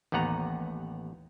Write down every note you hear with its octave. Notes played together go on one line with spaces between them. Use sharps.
A1 D#2 B3 F#5 A#5